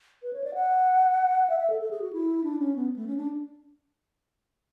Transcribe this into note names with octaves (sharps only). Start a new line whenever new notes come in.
B4
C#5
D5
F#5
E5
E5
A4
A4
G#4
F#4
E4
D4
C#4
B3
A3
C#4
D4